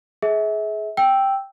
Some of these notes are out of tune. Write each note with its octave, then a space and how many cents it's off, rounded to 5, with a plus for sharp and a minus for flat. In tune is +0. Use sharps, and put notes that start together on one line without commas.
G#4 +25 E5 -30
G5 +0 E6 -5